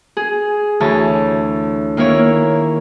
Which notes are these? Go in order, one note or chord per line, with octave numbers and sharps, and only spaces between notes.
G#4
D2 E3 C#5 A5
D#3 A#3 E4 C#5